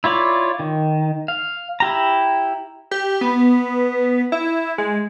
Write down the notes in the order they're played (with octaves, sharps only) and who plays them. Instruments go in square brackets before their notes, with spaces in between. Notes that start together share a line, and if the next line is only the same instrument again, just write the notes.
[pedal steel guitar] E4 F4 C#5 D5
D#3
F5
E4 G4 A#5
[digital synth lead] G4
B3
E4
G#3